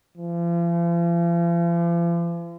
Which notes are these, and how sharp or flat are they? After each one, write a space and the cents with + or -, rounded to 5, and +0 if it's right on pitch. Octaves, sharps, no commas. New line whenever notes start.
F3 -45